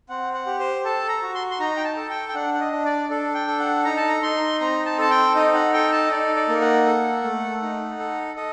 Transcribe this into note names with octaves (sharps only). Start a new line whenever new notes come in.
C4 F#5
F#5
G4
C5
A4 A5
A#5
F#4
C6
C6
D#4 A#5
G5
A5
A4
G5
G5
D4 F#5
F#5
D#5
D4
D5
D4 A4
G5
A4
F#5
D#4 A#5
A5
A#5
D#4 C6
C4 A#5
A5
A4 A5
G5
D#4 D#5
F#5
A4 G5
A5
D#5
D#4 D5
D5
A#3
F#5
A4
A3
D#4
A4
A4 D#5